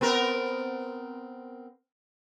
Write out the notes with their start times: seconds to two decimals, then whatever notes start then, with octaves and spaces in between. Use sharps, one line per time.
0.01 B3 C4 A#4